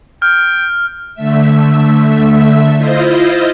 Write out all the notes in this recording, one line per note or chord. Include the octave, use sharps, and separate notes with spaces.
G5 F6
D3 A3 E5
E4 F4 C5 D#5